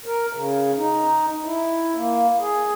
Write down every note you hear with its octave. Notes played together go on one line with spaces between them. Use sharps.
A#4
C#3
D#4
E4
A#3
G#4